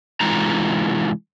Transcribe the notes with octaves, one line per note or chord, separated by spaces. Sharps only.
C3 E3 G#3 D#4 F4 A#5